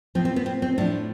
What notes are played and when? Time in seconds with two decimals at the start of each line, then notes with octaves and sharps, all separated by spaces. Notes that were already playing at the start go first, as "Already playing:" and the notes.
0.15 A2 F3 C4
0.25 C4
0.36 B3
0.46 C4
0.62 C4
0.78 A2 F3 D4